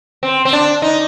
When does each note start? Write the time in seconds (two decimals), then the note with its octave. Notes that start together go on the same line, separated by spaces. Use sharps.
0.23 C4
0.45 C4
0.53 D4
0.82 D#4